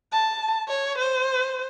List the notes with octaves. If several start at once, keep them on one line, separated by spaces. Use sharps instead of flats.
A5
C#5
C5